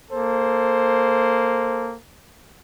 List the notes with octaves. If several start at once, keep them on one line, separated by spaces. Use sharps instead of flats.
A#3 A4 C5